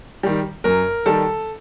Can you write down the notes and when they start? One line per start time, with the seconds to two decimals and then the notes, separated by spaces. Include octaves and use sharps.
0.23 D#3 G3
0.64 F#2 A#4
1.06 D#3 G3 A4